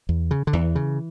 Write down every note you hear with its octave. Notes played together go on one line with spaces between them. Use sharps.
E2
C#3
D3
E2 E3
C#3